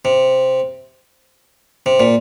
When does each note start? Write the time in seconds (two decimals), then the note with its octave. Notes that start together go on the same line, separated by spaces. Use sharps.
0.05 C3
1.86 C3
2.00 A#2